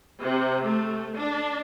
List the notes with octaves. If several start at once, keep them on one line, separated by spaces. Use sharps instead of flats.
C3
A3
D4